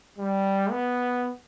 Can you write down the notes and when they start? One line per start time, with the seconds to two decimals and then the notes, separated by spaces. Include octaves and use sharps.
0.18 G3
0.70 B3